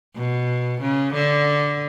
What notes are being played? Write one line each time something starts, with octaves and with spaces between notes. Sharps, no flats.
B2
C#3
D3